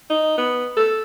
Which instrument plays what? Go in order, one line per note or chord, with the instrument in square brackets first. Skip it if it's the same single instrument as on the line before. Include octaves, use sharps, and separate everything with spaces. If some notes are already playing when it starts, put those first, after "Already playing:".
[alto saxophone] D#4
B3
A4